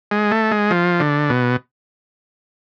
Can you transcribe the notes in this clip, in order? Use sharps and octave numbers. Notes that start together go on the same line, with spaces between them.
G#3
A3
G#3
F3
D3
B2